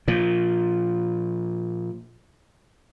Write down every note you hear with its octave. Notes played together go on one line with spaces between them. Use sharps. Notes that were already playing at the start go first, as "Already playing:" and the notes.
A#2 F3